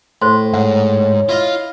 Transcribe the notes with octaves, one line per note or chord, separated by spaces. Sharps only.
A2 C5 C6
G#2 C#5 F#5
E4 F4 D#5 F5